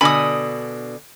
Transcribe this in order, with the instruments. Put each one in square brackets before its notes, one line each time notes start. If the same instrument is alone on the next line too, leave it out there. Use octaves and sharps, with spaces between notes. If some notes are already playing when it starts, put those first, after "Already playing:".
[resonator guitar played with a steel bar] B2 D3 G#5 [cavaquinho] B5 D#6